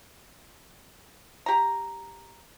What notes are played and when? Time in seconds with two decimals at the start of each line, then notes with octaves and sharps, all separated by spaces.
1.46 G4 A#5